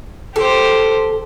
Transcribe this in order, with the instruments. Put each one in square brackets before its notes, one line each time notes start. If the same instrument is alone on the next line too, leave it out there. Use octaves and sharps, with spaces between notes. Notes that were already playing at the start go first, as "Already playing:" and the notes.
[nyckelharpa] G4 C5 [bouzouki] A4